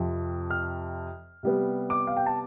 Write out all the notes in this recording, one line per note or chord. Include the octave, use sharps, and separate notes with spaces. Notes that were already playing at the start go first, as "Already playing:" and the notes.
Already playing: F2 C3 F3
F6
C3 G3 B3
D6
F5
G5
A5